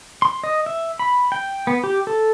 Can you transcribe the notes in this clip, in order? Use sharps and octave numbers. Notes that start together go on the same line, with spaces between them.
C6
D#5
E5
B5
G5
B3
G4
A4